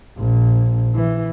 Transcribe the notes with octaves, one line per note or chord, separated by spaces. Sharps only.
A#1
E3